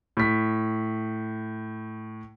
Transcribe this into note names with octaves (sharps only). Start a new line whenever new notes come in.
A2 B6